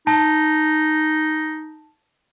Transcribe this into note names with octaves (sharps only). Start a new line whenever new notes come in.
D#4 A5